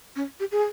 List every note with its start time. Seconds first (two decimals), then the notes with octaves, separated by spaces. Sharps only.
0.16 C#4
0.40 G4
0.52 G#4